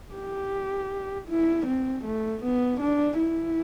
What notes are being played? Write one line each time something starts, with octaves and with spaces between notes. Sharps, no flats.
G4
E4
C4
A3
B3
D4
E4